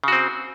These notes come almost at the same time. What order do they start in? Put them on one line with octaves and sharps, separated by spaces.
C#3 F#4 C4